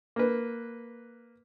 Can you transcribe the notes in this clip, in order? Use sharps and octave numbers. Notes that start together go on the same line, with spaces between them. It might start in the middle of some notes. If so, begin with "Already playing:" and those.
A#3 B4